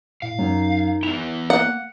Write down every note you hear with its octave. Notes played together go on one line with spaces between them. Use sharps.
A2 F5
F#2 D#4
B3 E4 F7
A#3 F#5